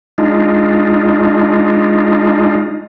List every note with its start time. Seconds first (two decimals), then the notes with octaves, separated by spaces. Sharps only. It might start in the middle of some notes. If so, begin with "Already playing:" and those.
0.18 G#3 D4 D#4 F4